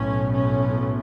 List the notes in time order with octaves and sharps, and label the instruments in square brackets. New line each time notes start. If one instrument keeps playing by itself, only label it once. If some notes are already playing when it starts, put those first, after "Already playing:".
Already playing: [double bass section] B1 A2 C#4
C#4